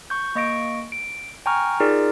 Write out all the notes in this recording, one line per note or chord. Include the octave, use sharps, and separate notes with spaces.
C#6 G6
A#3 D#5 C#6 A#6 D7
D7
G5 G#5 A#5 C#6 F6
D#4 F4 G#4 A#4 D5